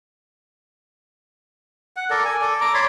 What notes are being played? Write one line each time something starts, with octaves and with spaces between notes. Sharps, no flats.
F#5
A4 A#4 D5
G#5
A4 D5
A#5 D6
C#5 D5 B5 C6